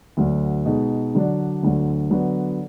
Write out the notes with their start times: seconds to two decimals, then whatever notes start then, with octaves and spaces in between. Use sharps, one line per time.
0.17 D2 D3 F#3
0.66 B2 G#3 D#4
1.15 D3 F#3 D4
1.63 D2 D3 F#3
2.11 D3 F#3 B3